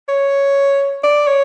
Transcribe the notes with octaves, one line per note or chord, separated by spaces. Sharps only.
C#5
D5
C#5